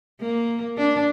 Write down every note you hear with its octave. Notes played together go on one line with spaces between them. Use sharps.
A#3
D4